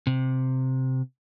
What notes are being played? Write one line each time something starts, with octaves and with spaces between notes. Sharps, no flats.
C3